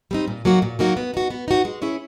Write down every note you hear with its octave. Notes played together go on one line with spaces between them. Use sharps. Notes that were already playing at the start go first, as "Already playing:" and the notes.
G3 C4 D#4
A#2
F#3 A#3 D#4 F#4
A#2
F#3 A#3 D#4 F#4
B3
D#4 F#4
B3
D#4 F#4
G#3
C#4 E4 G#4 C#5